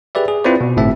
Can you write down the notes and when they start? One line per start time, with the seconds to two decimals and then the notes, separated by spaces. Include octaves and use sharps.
0.15 G4 G#4 B4 D5 E5
0.28 G#4
0.44 C4 E4 F4 B4 C5 D5
0.61 B2
0.77 G1 A2 C4 E5